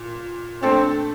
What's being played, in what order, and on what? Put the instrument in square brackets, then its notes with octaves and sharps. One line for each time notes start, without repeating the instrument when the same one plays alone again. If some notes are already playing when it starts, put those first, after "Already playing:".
Already playing: [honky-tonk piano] A#2
[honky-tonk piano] A3 D4 A4 [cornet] C4